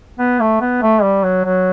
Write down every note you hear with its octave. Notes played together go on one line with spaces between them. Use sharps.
B3
A3
B3
A3
G3
F#3
F#3